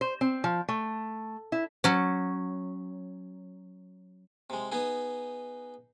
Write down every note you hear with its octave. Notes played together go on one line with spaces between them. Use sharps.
C5
C4
F3
A3
E4
F#3 C#4
C3 G#3
B3 D#4 G#4